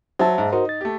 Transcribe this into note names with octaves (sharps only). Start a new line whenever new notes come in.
F#3 C5 E5 A5
G#2
D#4 F#4 A#4 C5
A6
A3 G4